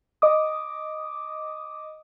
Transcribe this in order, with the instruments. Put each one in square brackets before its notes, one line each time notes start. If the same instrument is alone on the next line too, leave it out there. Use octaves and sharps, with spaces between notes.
[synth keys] D#5 D6 D#6